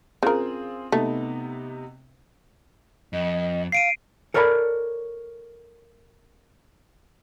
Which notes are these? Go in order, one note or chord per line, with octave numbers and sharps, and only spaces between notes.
C#3 C4 F4 G#4 A#4
C3 A3 B3 D#4
F2 D#5
F5 C7 D7 D#7
A4 A#4 C#5 D5 F#5 B5